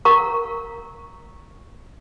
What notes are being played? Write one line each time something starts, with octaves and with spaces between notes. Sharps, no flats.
A#4 F5 A#5 C#6